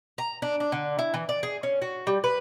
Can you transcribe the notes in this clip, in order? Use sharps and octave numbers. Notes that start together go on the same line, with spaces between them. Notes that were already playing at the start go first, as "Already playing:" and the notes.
A#5
D4
D4
D3
E4
E3
D5
G#4
C#4
F#4
G3
B4